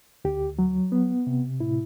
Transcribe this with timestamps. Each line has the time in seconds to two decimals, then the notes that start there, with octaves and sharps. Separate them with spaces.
0.25 D2 G4
0.59 F#3
0.92 B3
1.27 C3
1.60 A2 E4